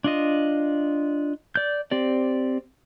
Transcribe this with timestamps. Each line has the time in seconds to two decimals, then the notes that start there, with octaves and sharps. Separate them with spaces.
0.04 D4 F4 D#5
1.56 D5 G6
1.91 C4 G4 D5